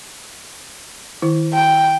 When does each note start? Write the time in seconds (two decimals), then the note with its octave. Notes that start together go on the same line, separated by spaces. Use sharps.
1.22 D#3 E4
1.53 G5